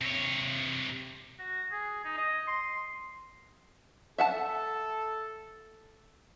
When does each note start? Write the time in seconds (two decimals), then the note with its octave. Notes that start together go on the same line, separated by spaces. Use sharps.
0.01 C3 C#5
1.39 F#4
1.71 G#4
2.05 D#4
2.18 D#5
2.48 C6
4.18 A4 E5 F#5 A5